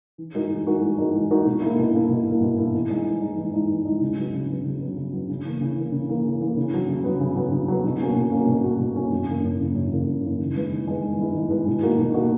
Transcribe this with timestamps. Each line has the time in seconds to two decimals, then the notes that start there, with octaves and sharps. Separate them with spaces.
0.18 E3
0.34 G#3 D#4 F#4 A#4
0.51 E3
0.66 G#3 D#4 F#4 A#4
0.83 E3
0.98 G#3 D#4 F#4 A#4
1.15 E3
1.31 G#3 D#4 F#4 A#4
1.46 B2
1.62 A#3 E4
1.79 B2
1.94 A#3 E4
2.11 B2
2.26 A#3 E4
2.41 B2
2.58 A#3 E4
2.74 E3
2.90 G#3 D#4
3.06 E3
3.22 G#3 D#4
3.37 E3
3.54 G#3 D#4
3.69 E3
3.85 G#3 D#4
4.01 C#3
4.17 F#3 B3
4.33 C#3
4.49 F#3 B3
4.65 C#3
4.81 F#3 B3
4.96 C#3
5.13 F#3 B3
5.30 C#3
5.44 E3 A#3
5.61 C#3
5.77 E3 A#3
5.92 C#3
6.09 E3 A#3
6.25 C#3
6.40 E3 A#3
6.57 C#3
6.72 F#3 B3
6.89 C#3
7.04 F#3 B3
7.20 C#3
7.36 F#3 B3
7.52 C#3
7.68 F#3 B3
7.84 B2
8.00 A#3 C#4 F#4
8.16 B2
8.32 A#3 C#4 F#4
8.47 B2
8.64 A#3 C#4 F#4
8.80 B2
8.96 A#3 C#4 F#4
9.11 F#2
9.27 C#3 E3 A#3
9.43 F#2
9.59 C#3 E3 A#3
9.75 F#2
9.92 C#3 E3 A#3
10.07 F#2
10.23 C#3 E3 A#3
10.39 D#3
10.55 G#3 B3 E4 B4
10.71 D#3
10.87 G#3 B3 E4 B4
11.03 D#3
11.19 G#3 B3 E4 B4
11.34 D#3
11.50 G#3 B3 E4 B4
11.67 B2
11.82 A#3 D#4 F#4 A#4
11.99 B2
12.14 A#3 D#4 F#4 A#4